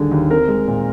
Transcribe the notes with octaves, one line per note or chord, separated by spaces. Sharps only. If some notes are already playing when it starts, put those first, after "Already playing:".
Already playing: D#2 D3 G3 G#4
D#2
C4 A#4
G#3
A#2